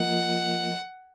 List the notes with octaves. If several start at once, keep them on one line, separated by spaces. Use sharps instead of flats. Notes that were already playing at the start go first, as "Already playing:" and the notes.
Already playing: F3 A#3 F4 A#4 D#5 F#5